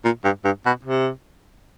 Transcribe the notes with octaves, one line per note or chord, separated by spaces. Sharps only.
A#2
G2
G2
B2
C3